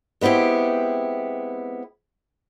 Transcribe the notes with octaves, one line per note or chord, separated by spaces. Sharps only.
G#3 B3 C4 E4 G4